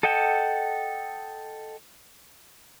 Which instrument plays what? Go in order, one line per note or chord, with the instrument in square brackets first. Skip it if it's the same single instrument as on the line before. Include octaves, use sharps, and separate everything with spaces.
[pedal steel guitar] A4 D#5 F#5 G5 A5